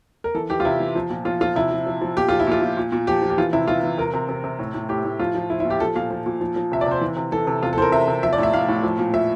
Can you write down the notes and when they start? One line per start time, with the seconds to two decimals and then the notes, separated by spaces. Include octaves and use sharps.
0.24 A#4
0.35 E3 A4
0.50 E3 G4
0.60 F4
0.65 C3 E4
0.80 E3
0.95 F3
1.10 A#2
1.25 F3 F4
1.41 F3 F4
1.56 C3 E4
1.71 F3
1.86 F3
2.02 F3
2.17 A#2 G4
2.29 F3 F4
2.40 E4
2.47 A#2 F4
2.62 A#2
2.77 A#2
2.92 A#2
3.07 F3 G4
3.22 F3
3.30 G4
3.38 E3 F4
3.53 C3 E4
3.68 E3 F4
3.83 E3
3.98 C3 A#4
4.14 C3
4.29 C3
4.44 C3
4.59 A2
4.74 A2
4.89 A2 G4
5.04 A2
5.19 F3 F4
5.35 F3
5.50 F3 E4
5.60 E4
5.65 A#2
5.70 G4
5.80 F3 A4
5.95 A#2 F5
6.11 F3
6.26 A#2
6.41 F3
6.56 F3
6.72 C3 E5
6.81 D5
6.86 C3 C5
7.01 E3
7.17 C3
7.32 E3 A4
7.47 C3
7.62 C3 F4
7.73 A4
7.77 E3 C5
7.82 A#4
7.92 C3 E5
8.08 C3
8.23 F3 E5
8.33 D5
8.38 A2 E5
8.53 A2 F5
8.68 A2
8.83 F3
8.98 A#2
9.13 F3 E5